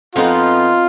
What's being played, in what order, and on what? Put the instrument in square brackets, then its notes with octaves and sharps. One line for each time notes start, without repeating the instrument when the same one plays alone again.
[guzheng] F2 F3 B3 D#4 [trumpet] F4